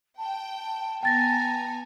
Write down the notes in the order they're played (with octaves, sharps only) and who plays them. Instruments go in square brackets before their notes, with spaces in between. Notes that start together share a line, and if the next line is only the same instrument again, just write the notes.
[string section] G5 [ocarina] A5
[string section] B3 G#5 A#5 [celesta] G5 A6 A#6